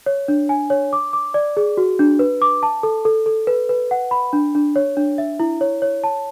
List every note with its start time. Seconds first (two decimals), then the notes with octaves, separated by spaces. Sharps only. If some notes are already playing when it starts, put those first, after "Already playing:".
0.06 C#5
0.28 D4
0.49 G#5
0.70 C#5
0.93 D6
1.13 D6
1.34 D5
1.57 G#4
1.77 F#4
1.99 D4
2.19 B4
2.42 D6
2.63 A5
2.83 A4
3.05 A4
3.26 A4
3.47 B4
3.69 B4
3.91 F#5
4.11 B5
4.33 D4
4.55 D4
4.76 C#5
4.97 D4
5.18 E5
5.40 E4
5.61 C#5
5.82 C#5
6.04 A5